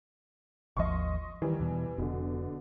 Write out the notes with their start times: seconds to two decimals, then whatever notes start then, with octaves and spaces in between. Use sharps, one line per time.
0.77 G#1 D#2 F3 D#5 C6 C#6
1.42 D#3 E3 G3
1.60 E2 B2
1.98 F1 B2 D3